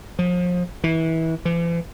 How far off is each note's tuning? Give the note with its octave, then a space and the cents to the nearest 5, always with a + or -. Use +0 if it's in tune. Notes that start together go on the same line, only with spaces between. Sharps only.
F3 +35
E3 -25
E3 +45